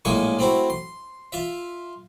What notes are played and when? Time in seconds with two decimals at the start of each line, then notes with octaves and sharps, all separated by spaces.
0.05 A#1 A2 G#3 A#3 G#5 C#6
0.39 A3 C4 E4 F#4
0.70 C6
1.32 F4 E5